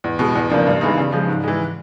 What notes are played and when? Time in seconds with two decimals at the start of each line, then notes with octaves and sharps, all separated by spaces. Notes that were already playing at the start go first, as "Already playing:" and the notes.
0.04 E2
0.19 B2 G#3
0.35 E2
0.50 C#3 F3 A#3 D4
0.67 G2
0.81 E3 G#3 B3 D#4
0.97 C#3
1.12 F3 G#3
1.28 G#2
1.44 E3 G#3